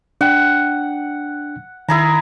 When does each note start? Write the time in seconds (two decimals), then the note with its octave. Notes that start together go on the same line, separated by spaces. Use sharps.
0.21 D4 F#5 G5
1.88 D#3 E4 G#4 A#5